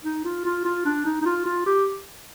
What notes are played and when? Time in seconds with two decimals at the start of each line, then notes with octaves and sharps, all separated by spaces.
0.05 D#4
0.25 F4
0.46 F4
0.65 F4
0.85 D4
1.06 D#4
1.21 D#4
1.26 F4
1.46 F4
1.66 G4